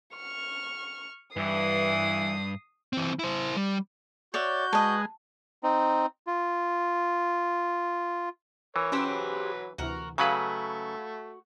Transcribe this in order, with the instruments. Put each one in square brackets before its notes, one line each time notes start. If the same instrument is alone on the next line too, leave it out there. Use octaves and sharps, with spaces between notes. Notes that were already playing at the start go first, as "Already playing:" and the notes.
[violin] C#6 F6
[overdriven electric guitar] G2 [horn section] E3 [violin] D#6 C7
[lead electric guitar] E3 C4
E4 C5
G3
[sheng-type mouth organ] F#4 G6 [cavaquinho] C#5 D5 E5
[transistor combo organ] G#3 [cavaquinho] B4 D#5 [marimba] A5
[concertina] C4 D#4
F4
[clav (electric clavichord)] E3 [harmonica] A#4 C#5
[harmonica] F#3 B4 [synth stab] C#4 E6 [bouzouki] G4 G#4 C5
[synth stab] D2 C3 E3 [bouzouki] F#4 A#4
[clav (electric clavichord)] C#3 F#3 B4 [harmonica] A3 [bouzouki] F#4 [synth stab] F5 B5 G#6